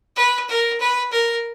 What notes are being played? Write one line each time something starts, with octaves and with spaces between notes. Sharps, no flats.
B4
A#4
B4
A#4